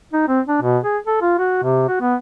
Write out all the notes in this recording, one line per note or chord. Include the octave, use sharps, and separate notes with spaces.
D#4
C4
D4
B2
G#4
A4
F4
F#4
C3
F#4
B3